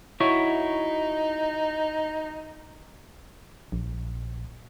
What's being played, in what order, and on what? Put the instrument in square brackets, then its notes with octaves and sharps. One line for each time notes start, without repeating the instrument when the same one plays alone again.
[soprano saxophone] D#4 [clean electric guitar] E4 F#4 C#5
[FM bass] A#1